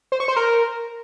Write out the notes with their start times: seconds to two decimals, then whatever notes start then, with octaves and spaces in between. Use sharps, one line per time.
0.12 C5
0.20 C#6
0.28 C5
0.36 A#4